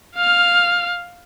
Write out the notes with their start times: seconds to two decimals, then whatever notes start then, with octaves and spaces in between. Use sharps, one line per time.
0.16 F5 F6